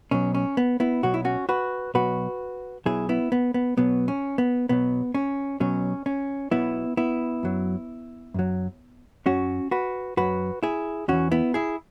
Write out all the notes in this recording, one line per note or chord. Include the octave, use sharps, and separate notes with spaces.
B1 B2 F#3 C#4
C#4
B3
B3 E4
B1 B2 F#3 F#4
E4
C#4 F#4
F#4 B4
B1 B2 F#3 F#4 B4
B1 B2 F#3 E4 G#4
B3 E4
B3
B3
B1 B2 F#3 B3
C#4
B3
B1 B2 F#3 B3
C#4
B1 B2 F#3 C#4
C#4
B1 B2 F#3 B3 E4
B3 E4
F#2 F#3
F#2 F#3
F#2 F#3 C#4 F#4
F#4 B4
F#2 F#3 F#4 B4
E4 G#4
E2 E3 C#4 F#4
B3 E4
E4 G#4